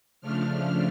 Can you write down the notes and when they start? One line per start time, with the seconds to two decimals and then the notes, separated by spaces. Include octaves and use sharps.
0.21 C#3 F3 A3 D4 F6